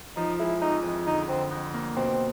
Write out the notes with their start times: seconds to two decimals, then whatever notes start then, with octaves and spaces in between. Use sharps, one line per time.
0.17 F3 D#4
0.39 G#3 E4
0.62 F2 D#4
0.84 F2
1.06 D3 D#4
1.28 D3 C4
1.51 F2
1.74 A#3
1.96 B2 C4